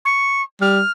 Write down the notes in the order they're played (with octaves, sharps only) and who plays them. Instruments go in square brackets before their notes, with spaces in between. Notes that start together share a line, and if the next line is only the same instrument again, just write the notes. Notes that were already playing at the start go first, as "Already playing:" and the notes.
[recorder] C#6
[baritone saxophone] G3 [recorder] F6